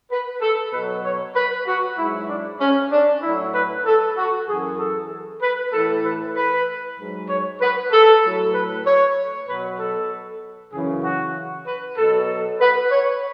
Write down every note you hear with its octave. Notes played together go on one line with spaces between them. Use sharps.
B4
A4
B2 F#3 B4
C#5
B4
F#4
G#2 F#3 E4
D4
C#4
D4
A2 F#3 E4
B4
A4
F#4
F#2 E3 G#4
A4
B4
A2 E3 A4
B4
B4
G#2 F#3
C#5
B4
A4
A2 F#3
B4
C#5
B2 F#3 B4
A4
F#2 C#3 E3 G#4
F#4
B4
B2 F#3 A4
B4
C#5